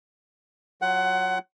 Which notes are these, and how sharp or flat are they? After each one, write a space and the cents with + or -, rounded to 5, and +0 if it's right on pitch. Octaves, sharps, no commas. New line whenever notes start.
F#3 -10 F4 +0 F#5 +20